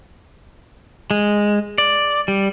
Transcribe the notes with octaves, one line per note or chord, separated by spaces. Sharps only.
G#3
D5
G3